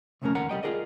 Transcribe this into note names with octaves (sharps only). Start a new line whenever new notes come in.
C2 F2 C#3 A3 C#4 A#4
D#2 A#4 C#5 F#5 A#5
C#2 G3 D#5 G5
F4 F#4 G#4 A#4 D5 D#5